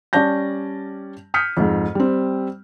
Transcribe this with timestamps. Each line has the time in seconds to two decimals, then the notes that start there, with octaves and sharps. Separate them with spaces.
0.13 G3 C#4 D5 A5 G6 A#6
1.34 D#6 F6 G6 B6 C#7
1.57 F2 G#2
1.95 G3 C4